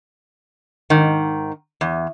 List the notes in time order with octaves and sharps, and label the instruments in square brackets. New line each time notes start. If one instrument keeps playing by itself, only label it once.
[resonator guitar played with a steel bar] G#2 D#3
E2